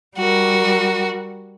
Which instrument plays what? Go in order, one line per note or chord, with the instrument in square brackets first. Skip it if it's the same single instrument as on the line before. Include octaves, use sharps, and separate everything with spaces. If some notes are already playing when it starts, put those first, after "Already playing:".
[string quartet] G3 F#4 A#4